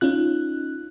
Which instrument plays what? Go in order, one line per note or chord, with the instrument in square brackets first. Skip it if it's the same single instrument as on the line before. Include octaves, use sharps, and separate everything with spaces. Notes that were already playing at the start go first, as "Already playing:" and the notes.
[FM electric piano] C#4 D#4 F4 F#6